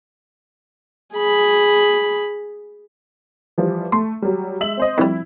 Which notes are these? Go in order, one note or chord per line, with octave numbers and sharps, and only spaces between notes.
G#4 B5
E3 F3 G3
A3 C6
F#3 G3
G#3 E5 F#7
C4 C5 D#5
F2 G3 E4